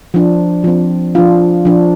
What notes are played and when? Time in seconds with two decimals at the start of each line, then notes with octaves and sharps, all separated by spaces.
0.14 F3 D4
0.64 F3 C4
1.15 F3 D4 F4
1.65 F3 D4